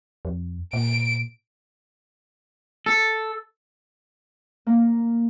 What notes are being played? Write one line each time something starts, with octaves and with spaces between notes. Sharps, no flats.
F2
A#2 D7
A4
A#3